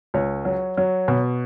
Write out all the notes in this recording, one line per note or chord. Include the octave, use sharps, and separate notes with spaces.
C#2 C#5
F#3
F#3
B2